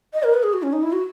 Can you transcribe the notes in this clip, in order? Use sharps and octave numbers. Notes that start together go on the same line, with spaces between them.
D#5
A#4
B4
G#4
F#4
C#4
D#4
E4
F#4